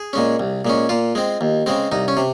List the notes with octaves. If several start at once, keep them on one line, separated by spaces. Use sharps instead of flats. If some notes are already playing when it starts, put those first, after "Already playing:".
Already playing: G#4
A#2 G#3 C#4
C2
A#2 G#3 C#4
A#2 F4
G#3 C4
D#2
C#3 G#3 C4
C2 D#4
C#4
C3